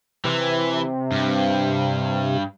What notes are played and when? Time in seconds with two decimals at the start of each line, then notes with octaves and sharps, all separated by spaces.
0.25 C3 E3
1.12 G2